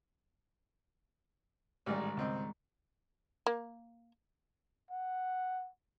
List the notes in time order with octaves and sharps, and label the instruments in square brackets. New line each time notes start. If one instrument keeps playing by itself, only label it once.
[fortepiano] A1 G#3 D5 [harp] G#2 D#3 G3
[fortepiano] C#2 C4 D#5
[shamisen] A#3
[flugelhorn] F#5